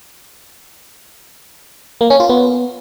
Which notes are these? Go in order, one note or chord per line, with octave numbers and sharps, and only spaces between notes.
A#3
C#4
F4
B3